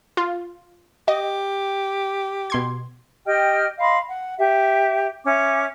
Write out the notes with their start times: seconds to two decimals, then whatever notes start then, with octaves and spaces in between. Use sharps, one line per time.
0.17 F4
1.08 G4 D#5
2.50 B2 C6 G#6
3.26 G4 D#5 G5 F6
3.79 D#5 F5 B5 C6
4.09 F#5
4.39 G4 E5
5.24 C#4 E5 D6